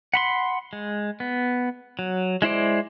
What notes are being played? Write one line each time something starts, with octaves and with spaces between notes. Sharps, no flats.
F#5 B5 C6
G#3
B3
F#3
G#3 E4 C5 D5